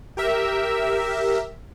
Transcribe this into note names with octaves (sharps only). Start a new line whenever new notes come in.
G4 A#4 E5